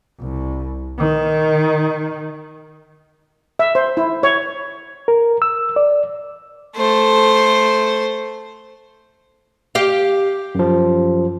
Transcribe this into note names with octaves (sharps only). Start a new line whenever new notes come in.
C2
D#3
E5
C5
E4
C#5
A#4
E6
D5
A3 C5
G4 F5
F#2 F3